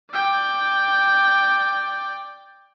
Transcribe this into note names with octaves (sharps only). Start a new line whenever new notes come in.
D5 G5